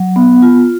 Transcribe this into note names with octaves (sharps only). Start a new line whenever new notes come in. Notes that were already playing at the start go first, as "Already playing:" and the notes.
Already playing: F#3
B3
F4